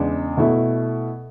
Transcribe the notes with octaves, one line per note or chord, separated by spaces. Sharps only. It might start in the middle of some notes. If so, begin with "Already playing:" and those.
Already playing: E2 C#3 G#3 D4
B2 A3 E4